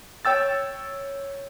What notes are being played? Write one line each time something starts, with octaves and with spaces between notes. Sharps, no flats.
C#5 G5 E6 A6